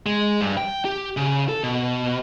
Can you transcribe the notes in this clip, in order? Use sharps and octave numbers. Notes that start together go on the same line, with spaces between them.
G#3
G2
G5
G4
C#3
A4
B2